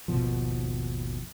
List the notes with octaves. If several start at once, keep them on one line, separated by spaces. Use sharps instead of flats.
G#1 D#2 B2 F3